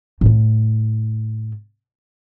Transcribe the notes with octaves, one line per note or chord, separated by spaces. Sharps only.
A2 A3